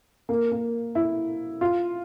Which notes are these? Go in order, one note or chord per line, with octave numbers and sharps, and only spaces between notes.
A#3
A#3
E4
F4